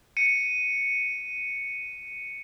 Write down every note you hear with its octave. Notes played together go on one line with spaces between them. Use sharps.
C#7 D#7